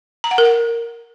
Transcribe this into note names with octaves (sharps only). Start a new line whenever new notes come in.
A#5
F#5
A#4
F#5